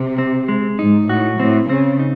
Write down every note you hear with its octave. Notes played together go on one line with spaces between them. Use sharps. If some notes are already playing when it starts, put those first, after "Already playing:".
Already playing: C3
C4
G#3
G#2 D#4
A2 F#4
A2 C4
C#3 C4
D#4